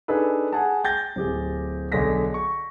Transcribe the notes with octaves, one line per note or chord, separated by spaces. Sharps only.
D4 D#4 G#4 A4 B4
G#4 F#5 G#5 A5
G5 G6 A6 A#6
D1 G4 G#4
B1 D3 G#4 A#6 B6
C#6